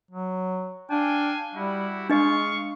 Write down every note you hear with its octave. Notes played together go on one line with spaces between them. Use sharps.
F#3
D4 F5 G5 G#5
G3 E4 F#4 G4
G#3 D4 D#5 F5 C#6